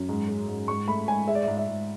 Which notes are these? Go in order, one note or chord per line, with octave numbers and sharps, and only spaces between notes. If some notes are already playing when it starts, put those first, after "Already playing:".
Already playing: F#2
G#2
G#3
G#2
G#2 C#6
A3 B5
G#2 G#5
G#3 E5
D5
G#2 E5
E5
G#2